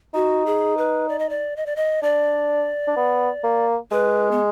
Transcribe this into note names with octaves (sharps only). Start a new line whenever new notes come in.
D#4 F#4
G#4
B4
D5
D#5
D5
D#5
D5
D#5
D4 D5
D4
B3
A#3
G#3 B4
B3